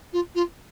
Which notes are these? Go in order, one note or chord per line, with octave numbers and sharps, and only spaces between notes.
F4
F4